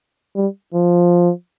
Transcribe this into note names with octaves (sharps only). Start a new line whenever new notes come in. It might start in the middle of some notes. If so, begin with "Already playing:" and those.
G3
F3